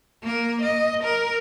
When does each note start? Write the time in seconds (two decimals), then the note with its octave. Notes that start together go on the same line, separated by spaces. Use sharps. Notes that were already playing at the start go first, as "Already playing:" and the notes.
0.22 A#3 A#4
0.62 D#5
1.04 A#4